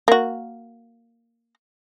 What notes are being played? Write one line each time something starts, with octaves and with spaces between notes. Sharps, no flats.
A#3 F#4